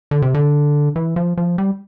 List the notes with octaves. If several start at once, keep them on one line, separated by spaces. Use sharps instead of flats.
D3
C3
D3
E3
F3
F3
G3